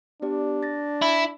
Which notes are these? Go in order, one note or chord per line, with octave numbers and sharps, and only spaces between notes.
B3 D4 G4 D5
A6 A#6
E4